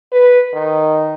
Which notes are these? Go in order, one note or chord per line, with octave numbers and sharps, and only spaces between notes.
B4
D#3